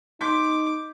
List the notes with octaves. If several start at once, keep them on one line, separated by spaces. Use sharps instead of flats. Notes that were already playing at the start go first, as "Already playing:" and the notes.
D#4 C6 D6 G6 B6